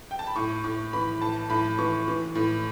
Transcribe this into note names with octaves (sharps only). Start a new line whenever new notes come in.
G5
A5
B5
A2 C#6
A2 C#6
E3 B5
A2 A5
A2 B5
E3 C#6
E3
A2